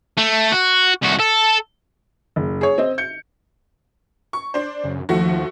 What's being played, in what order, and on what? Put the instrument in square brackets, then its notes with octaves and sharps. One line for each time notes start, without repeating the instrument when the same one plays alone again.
[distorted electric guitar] A3
F#4
C2 F#4
A4
[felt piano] F#1
G#4 C#5
C4 D#5
G6 C#7
[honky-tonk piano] C#6
D4 C5
[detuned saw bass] F#2 [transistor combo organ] C#3
[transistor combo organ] D#2 [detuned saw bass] F3 [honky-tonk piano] A3 F#4